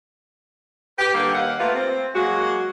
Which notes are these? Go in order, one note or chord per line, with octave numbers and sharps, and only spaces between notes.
G4 B4
D3 G3 A#3 G4 A4 B4
D#2 F5 F#5
A3 A#3 F4 G4 B4
C4
F#3 G#3 A#3 F#4